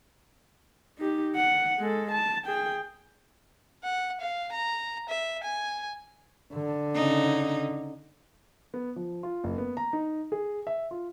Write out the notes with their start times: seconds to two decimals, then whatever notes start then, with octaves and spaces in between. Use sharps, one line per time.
0.98 D#4 G4
1.36 F#5
1.79 G#3 A4
2.12 A5
2.46 G#4 G5
3.83 F#5
4.21 F5
4.52 A#5
5.09 E5
5.44 G#5
6.54 D3
6.94 C#3 D#4
8.74 B3
8.96 F3
9.23 F4
9.44 F#1
9.58 B3
9.77 A#5
9.93 D#4
10.32 G#4
10.67 E5
10.91 F4